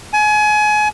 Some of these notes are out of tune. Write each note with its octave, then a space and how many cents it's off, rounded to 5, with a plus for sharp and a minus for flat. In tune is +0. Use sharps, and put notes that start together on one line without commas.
G#5 +30